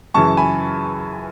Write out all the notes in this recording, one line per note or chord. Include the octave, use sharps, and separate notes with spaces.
F#2 C#3 E3 A5 C#6
G#5 B5